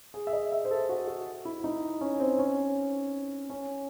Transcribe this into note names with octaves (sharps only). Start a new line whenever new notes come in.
G#4
E5
D#5
E5
C5
A4
F#4
F#4
E4
D#4
C#4
C4
C#4
C#4